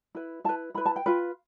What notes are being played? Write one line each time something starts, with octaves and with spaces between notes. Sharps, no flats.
E4 B4
E4 B4 A5
E4 B4 B5
A5
G5
F4 B4